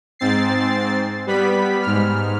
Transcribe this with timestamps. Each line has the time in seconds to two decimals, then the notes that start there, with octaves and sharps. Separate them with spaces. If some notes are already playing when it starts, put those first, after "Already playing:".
0.19 G#2 C4 A6 C7
1.27 G3 B3 B5 B6
1.82 G#2 F6